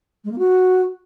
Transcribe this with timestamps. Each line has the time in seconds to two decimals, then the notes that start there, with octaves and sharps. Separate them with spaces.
0.24 G#3
0.31 A#3
0.38 F#4